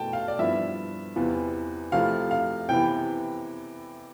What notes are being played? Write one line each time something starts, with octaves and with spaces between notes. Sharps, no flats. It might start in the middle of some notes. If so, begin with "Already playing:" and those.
Already playing: B2 A3 E4 G5 A5
F5
D5
G2 F3 B3 E4 E5
E2 C3 E3 B3 F4
C3 F3 A3 E4 F5
F5
C3 E3 B3 E4 G5